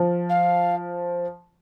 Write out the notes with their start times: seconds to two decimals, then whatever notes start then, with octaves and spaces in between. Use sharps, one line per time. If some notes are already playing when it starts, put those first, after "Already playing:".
Already playing: F3
0.29 F5